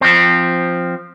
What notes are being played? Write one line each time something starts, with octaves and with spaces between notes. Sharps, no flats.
F3 C4